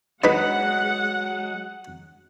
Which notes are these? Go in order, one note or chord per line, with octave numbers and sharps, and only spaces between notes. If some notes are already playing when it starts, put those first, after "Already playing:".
F#3 G#3 D#4 B4 F#5 B5